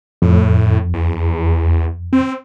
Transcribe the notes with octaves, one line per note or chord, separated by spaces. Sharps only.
F2 A2
E2
C4